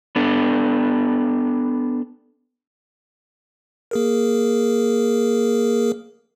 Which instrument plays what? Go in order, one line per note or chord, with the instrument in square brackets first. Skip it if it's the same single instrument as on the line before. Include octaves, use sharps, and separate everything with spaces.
[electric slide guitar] B3 D4 A4
[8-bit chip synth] A#3 G#4 A#4